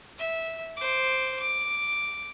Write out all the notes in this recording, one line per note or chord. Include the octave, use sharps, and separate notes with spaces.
E5
C5 D6
D6